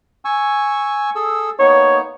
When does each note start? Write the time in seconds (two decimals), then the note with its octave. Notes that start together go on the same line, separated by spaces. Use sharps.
0.25 G#5 C#6 E6
1.15 G#4 A4 E6
1.59 A#3 B3 D#4 C#5